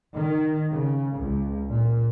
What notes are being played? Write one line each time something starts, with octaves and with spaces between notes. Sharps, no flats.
D#3
C#3
C#2
A#2